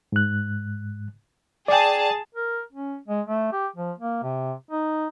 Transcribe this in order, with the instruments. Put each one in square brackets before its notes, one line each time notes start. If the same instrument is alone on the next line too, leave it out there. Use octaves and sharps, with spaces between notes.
[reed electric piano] G#2 F#6
[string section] G#4 A5 [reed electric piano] D5 G5
[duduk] A#4
C#4
G#3
A3
G4
F3
A#3
C3
D#4